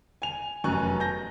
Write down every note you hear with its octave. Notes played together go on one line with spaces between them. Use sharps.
G#5 F7
F1 F#2 G#5 C#6 F#6
G6 A#6